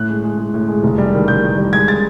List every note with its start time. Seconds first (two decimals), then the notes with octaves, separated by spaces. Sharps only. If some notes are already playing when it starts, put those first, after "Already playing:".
Already playing: A2 F#6
0.09 G#3
0.24 G#3
0.38 G#3
0.54 A2
0.68 G#3
0.83 F1
0.98 G3
1.13 D#3
1.28 D#3 G6
1.43 D#3
1.58 G3
1.73 G#3 G#6
1.88 G#3 A6